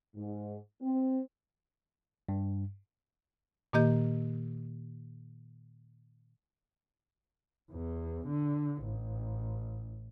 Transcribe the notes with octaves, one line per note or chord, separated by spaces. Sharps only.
G#2
C4
G2
A#2 D#3 A#3 G4 D#5 G6
E2
D3
A1